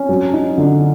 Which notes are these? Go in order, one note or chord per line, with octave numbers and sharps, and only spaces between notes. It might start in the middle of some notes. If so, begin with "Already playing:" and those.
Already playing: C#4
F#3
D#4
D3